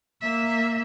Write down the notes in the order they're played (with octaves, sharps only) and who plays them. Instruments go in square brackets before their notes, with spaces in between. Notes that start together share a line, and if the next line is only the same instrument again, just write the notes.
[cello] A#3 E5